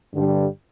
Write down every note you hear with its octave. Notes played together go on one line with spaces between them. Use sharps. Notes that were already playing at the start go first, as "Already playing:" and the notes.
G2 D3 G3